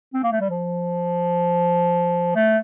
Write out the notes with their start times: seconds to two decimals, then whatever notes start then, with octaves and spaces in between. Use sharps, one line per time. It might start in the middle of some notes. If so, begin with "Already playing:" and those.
0.14 C4
0.23 A#3
0.32 A3
0.40 G3
0.50 F3
2.36 A3